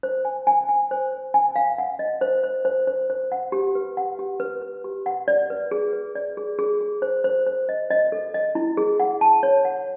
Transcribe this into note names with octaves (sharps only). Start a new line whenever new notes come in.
C5
G#5
G#5
G#5
C5
C5
G#5
F5
F#5
D#5
C5
C5
C5
C5
C5
F#5
G4
B4
F#5
G4
B4
B4
G4
F#5
D5
B4
G#4
B4
D5
G#4
G#4
G#4
C5
C5
C5
D#5
D#5
A4
D#5
E4
G#4
F#5
A5
C#5
F#5